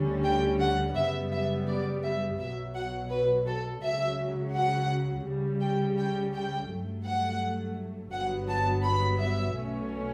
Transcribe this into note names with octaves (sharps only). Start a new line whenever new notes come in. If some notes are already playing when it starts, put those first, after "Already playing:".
Already playing: D2 D3 G3 C#4
G5
F#5
F#2 C#3 G3 B3 E5
E5
D5
E5
B1 B2 F#3 E5
F#5
B4
A4
C#2 C#3 F#3 E5
F#5
C#2 C#3 G3
G5
G5
G5
G2 F#3 A3
F#5
G1 G2 F#3 B3 F#5
A5
B5
E5
B1 B2 A3 C#4